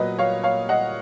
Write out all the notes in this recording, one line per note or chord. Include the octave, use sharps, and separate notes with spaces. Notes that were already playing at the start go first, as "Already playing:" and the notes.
Already playing: A#2 F#3 B3 B4 D#5
C#5 F5
C#5 F5
D#5 F#5